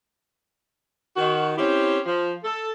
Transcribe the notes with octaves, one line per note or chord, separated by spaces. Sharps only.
D#3 F#4
C4 C#4 E4 G4
F3
A4